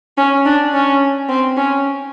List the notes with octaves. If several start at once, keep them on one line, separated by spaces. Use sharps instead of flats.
C#4
D4
C#4
C4
C#4